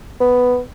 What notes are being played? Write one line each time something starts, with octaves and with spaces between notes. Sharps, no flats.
B3